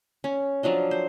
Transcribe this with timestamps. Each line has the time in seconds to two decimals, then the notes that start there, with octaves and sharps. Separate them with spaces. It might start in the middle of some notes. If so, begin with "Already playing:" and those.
0.24 C#4
0.63 F3 F#3 D4 D#5
0.91 C5